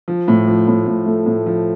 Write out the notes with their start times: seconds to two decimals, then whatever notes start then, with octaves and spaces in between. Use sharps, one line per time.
0.08 F3
0.28 A2
0.47 F3
0.68 A2
0.86 A2
1.06 A3
1.26 A2
1.46 F3